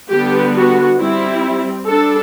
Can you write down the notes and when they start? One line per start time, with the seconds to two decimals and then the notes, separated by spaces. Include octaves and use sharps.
0.10 D3 G3 B3 G4
0.55 F#4
0.99 G3 C4 E4
1.87 G3 D4 A4